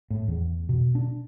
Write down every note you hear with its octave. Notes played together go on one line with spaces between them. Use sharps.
A2
E2
B2
D4